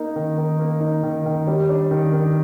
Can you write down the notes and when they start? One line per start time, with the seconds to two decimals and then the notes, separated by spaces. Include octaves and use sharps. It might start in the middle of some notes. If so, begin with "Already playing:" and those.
Already playing: A#3 D#4
0.16 D#3
0.38 D#3
0.59 A#3
0.80 D#4
1.03 D#3
1.26 D#3
1.47 G3
1.69 D4
1.91 D#3
2.13 D#3